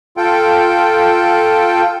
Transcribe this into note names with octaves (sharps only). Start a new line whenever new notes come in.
F4 A4 G5